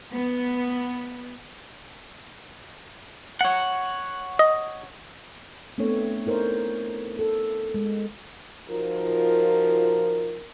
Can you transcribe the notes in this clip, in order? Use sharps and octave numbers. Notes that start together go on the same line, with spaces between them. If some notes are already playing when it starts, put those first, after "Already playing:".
B3
C#5 F#5
D#5
A3 B3 C4 D4 A4 C#5
D#4 E4 A#4 C5 C#5
A4
G#3
F3 D#4 F4 F#4 A#4